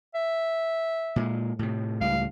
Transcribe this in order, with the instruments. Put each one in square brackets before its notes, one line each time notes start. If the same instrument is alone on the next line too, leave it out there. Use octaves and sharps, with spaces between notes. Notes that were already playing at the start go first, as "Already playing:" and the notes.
[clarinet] E5
[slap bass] A#2 G3 G#3
A2 C3
[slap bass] C#2 A2 G3 [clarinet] F5